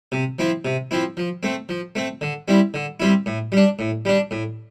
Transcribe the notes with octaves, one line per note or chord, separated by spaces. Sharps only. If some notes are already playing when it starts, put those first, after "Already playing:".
C3
F3 C4 E4
C3
F3 C4 E4
F3
A3 C4
F3
A3 C4
D3
G3 C4 E4
D3
G3 C4 E4
A2
G3 D4
A2
G3 D4
A2